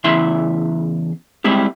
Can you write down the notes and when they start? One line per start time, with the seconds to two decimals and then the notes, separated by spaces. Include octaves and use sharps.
0.04 E2 C#3 E4 E5 C6
1.44 G3 G#3 C4 E4 G4